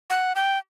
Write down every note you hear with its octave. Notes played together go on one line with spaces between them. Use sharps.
F#5
G5